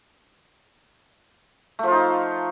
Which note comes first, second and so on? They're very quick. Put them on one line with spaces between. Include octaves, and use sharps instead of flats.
A3 F3 F4 D#4